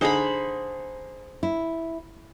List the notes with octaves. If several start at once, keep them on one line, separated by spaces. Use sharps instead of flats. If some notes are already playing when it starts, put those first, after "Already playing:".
D3 D#4 G#4 C5 B5
E4